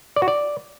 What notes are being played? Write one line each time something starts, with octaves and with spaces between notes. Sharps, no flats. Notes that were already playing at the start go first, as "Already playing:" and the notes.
D5
F#4
D5